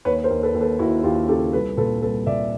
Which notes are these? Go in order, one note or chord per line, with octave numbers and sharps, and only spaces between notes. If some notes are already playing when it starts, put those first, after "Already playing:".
D#2 B4 C#5
A#4 C5
D#2
A4 B4
D#2
A4 B4
D#2 E4 F#4
D#2 F4 G4
C#3 G4 A4
C2 A4 B4
A#2 A4 B4
C2 A4 B4
A#2 D5 E5